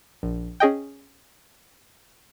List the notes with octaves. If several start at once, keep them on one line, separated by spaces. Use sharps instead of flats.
A#1
C#4 G#4 D#5 G5